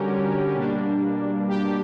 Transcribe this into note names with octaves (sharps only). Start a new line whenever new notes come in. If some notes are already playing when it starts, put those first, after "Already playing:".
Already playing: D3 G3 C#4 F#4 G4 A#4
B2 G3 A#3 D4
G4